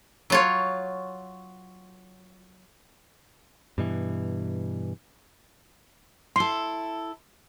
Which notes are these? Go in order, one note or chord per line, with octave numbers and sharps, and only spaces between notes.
F#3 F4 C#5
G2 B2 E3
E4 A4 C6